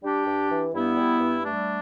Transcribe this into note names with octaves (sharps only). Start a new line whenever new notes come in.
G3 D4 G4
G2
E3
G2 B3 E4
G3
G2
G3 A3 D4